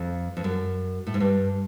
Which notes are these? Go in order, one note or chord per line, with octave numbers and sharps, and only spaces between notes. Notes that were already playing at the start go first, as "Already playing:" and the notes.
Already playing: F2
F2
F#2
A2
G#2
G2